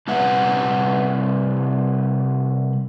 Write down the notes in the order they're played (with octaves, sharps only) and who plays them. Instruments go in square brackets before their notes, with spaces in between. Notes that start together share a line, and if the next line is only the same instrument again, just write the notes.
[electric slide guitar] C3 G3 E4 B4 E5 F#5